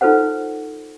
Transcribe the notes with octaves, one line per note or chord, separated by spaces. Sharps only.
D#4 F4 A4 B4 C5 F#5